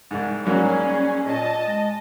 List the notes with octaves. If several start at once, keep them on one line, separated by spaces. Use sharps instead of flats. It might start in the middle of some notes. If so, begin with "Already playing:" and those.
C2 G#2
G#2 F#3 G3 A#3 C#4 G#4
A#2 D#5 A5
G#3